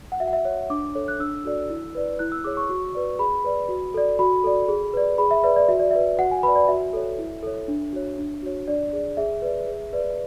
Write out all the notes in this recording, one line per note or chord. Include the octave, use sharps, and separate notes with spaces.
F#5
F#4 E5
F#5
E5
C#5 E5
E5
D4 D6
A4 C#5
F#6
D4 E6
F#4 A4 D5
E4
B4 D5
E4 F#6
E6
G#4 C#5 D6
C#6
F#4
B4 D5
G#4 B5
B4 D5
F#4
A4 D5
F#4 B5
A4 D5
G#4
B4 D5
G#4 B5
E5
B4 D5 E5
D5
F#4 E5
D5
B4 D5 E5
F#4 F#5
G#5
B4 D5 B5
D5
F#4 E5
A4 C#5
E4
A4 C#5
D4
F#4 C#5
D4
F#4 C#5
D4 D5
G#4 D5
G#4 E5
B4 D5
G#4
B4 D5